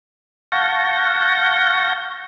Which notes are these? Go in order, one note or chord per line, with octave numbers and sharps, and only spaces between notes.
F5 F#5 A5 C#6 G6 A#6